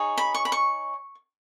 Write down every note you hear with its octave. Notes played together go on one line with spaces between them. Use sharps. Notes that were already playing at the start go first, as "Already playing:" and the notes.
Already playing: D#4 G#4 C#5
B5
C#6
B5
C#6